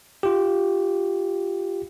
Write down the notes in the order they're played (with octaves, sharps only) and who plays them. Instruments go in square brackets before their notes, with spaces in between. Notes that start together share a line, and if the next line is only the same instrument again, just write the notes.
[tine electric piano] F4 G4